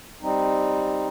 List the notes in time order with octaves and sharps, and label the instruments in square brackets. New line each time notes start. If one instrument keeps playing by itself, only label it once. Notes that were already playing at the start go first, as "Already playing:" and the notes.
[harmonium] G3 C4 D#4